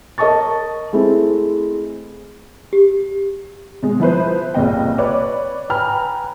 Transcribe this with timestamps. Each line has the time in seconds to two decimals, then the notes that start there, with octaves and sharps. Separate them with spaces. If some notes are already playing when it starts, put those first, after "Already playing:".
0.18 A#4 C#5 D#5 A5 C#6 A6
0.93 G#3 A3 C4 E4
2.73 G4
3.82 B2 G#3
4.00 F3 E4 B4 C5
4.54 F#1 C2 A#2 D#5 G5
4.98 B4 C#5 D5 D6
5.70 B4 G5 G#5 A#5 B5 F6